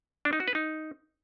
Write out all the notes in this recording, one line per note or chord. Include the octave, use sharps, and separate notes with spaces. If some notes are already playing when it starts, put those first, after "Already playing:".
D4
D#4
F#4
B4
D#4